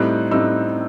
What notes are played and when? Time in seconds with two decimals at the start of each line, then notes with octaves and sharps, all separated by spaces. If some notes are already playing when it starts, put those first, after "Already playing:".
Already playing: A2 G3 C4 D#4 F#6
0.31 A2 G3 C4 D#4 E6